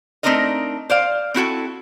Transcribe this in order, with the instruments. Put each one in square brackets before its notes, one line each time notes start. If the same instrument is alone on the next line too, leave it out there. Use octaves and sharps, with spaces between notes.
[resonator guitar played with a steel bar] A3 C4 D4 D#4 A#4 D#5
C5 D5 F5
C4 E4 F#4 A4